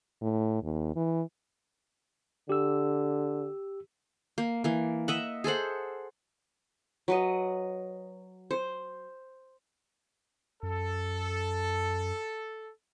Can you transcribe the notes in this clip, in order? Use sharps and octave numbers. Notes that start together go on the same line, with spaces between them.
A2
D#2
E3
D3 G4 E6
A#3
E3 A#3
D#5 E5 F#5
G#4 A4 C5 F#5
F#3 B4 D#5
C5
F#2 A4